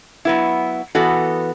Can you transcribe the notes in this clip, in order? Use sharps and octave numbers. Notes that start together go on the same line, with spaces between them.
F#3 B3 E4
E3 B3 F#4 A4